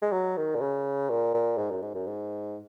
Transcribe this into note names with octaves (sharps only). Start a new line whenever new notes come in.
G#3
F#3
D#3
A#2
C#3
A#2
A#2
G#2
F#2
G#2
F#2
G#2